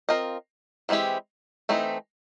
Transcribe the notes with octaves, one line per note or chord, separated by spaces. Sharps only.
C4 F4 A#4 D#5
E3 G#3 C4 E4 G4
E3 A3 C4 D#4